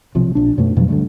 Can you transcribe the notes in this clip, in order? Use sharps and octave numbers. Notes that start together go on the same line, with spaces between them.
B1 C3 F3
A#1 D4
F#2 B2 A3
F2 B2 F3 F#3
D2 G2 D3